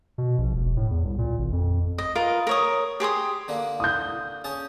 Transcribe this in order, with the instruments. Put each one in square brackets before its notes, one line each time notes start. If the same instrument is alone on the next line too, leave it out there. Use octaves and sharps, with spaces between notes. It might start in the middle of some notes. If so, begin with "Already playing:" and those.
[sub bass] B2
A#1
E1
A2
E2
C2
A#2
G#1
F2
[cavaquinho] D#5
F4 A#4 B4 D#5
A#4 C#5 D#6
G4 G#4 C6 D#6
[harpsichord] D3 A#3 D4
[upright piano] D#6 G6
[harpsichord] C#4 G#4 A5